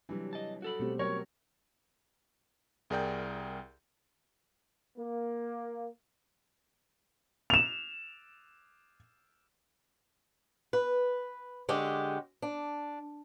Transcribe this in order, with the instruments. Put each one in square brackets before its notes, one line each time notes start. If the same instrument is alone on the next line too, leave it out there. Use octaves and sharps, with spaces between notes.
[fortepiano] C3 E3 [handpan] F#3 G3 D4
[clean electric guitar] D#5 A5
F#4 A4 B5
[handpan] B2 C4 G4 [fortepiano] G3 A3
[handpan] F#3 [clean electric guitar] A#4 [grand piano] C#5
[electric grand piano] C2 G#4 A#4 D5 G5 G6
[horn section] A#3
[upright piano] E7 F7
[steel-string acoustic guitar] B4
D3 G#3 C#4 G4
D4